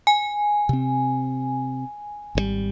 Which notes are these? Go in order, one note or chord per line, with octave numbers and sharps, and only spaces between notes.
G#5
C3 C4
G#1 C3 G3